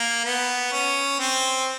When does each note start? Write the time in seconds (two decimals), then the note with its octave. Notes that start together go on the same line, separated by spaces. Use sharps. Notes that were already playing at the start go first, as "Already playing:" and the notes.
Already playing: A#3
0.25 B3
0.72 C#4
1.19 C4